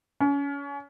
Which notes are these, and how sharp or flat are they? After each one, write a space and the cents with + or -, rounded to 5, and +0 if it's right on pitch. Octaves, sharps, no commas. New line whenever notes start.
C#4 +30